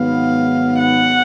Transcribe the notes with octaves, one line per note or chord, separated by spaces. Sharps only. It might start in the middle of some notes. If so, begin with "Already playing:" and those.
Already playing: G#2 D#3 F#3 B3 F5
F#5